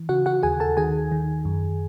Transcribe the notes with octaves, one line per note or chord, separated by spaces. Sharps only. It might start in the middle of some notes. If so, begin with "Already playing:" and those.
Already playing: E3
C#3 F#4 F#5
F#4 F#5
D#2 G#4 G#5
A4 A5
D#3 G#4 G#5
D#3
F#2